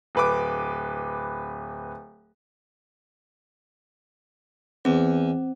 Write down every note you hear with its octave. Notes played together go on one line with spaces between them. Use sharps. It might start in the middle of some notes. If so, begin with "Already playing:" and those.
D1 B4 D6
E2 C4